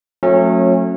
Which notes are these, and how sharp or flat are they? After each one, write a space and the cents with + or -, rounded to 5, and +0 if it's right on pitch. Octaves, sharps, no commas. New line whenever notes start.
F#3 -35 A3 +10 C#4 -25